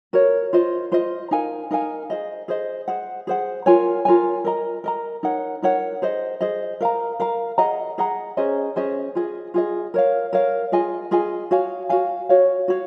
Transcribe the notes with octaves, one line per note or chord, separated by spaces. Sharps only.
F#4 A#4 C#5
F4 C5 D#5
F4 C5 D#5
D#4 A#4 F5 G#5
D#4 A#4 F5 G#5
G#4 C5 D#5
G#4 C5 D#5
G#4 C5 F#5
G#4 C5 F#5
F4 A#4 C#5 G#5
F4 A#4 C#5 G#5
A#4 D#5 A#5
A#4 D#5 A#5
D#4 A#4 C#5 F#5
D#4 A#4 C#5 F#5
G#4 C5 D#5
G#4 C5 D#5
A#4 F5 A#5
A#4 F5 A#5
G#4 D#5 F#5 A#5
G#4 D#5 F#5 A#5
C#4 G#4 C5 D#5
C#4 G#4 C5 D#5
F4 G#4 D#5
F4 G#4 D#5
A#4 C#5 F5
A#4 C#5 F5
F4 G#4 D#5 G#5
F4 G#4 D#5 G#5
F#4 C#5 F5 G#5
F#4 C#5 F5 G#5
F#4 C#5 F5
F#4 C#5 F5